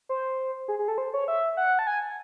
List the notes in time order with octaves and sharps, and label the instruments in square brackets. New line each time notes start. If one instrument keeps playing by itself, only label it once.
[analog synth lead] C5
G#4
G#4
A4
C5
C#5
E5
F#5
A5
G#5